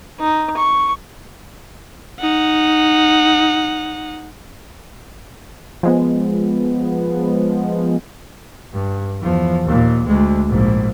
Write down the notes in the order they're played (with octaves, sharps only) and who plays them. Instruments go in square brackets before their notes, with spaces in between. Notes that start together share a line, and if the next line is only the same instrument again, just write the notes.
[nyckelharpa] D#4
C#6
[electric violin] D#4 F#5
[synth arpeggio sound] F3 G#3 B3
[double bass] G2
E2 F3
D#2 A#2
D2 G#3
A#1 G#2